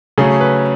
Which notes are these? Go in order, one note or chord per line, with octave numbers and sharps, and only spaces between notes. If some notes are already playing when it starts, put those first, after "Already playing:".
C#3 F#3 A3 C#4 G#4
B4